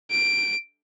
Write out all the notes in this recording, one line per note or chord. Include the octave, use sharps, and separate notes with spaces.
D7